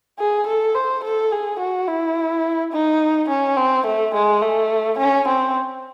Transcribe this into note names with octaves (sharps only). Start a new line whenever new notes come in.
G#4
A4
C5
A4
G#4
F#4
E4
D#4
C#4
C4
A3
G#3
A3
C#4
C4